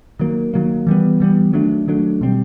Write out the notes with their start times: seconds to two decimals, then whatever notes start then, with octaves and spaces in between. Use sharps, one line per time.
0.20 D#3 F#3 A#3
0.54 D#3 F#3 A#3
0.87 E3 G3 B3
1.20 E3 G3 B3
1.53 D#3 F#3 A3 D4
1.88 D#3 F#3 A3 D4
2.21 B2 G3 C4